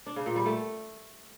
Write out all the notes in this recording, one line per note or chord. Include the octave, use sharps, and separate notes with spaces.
D4
C#3
A#2
G3
A3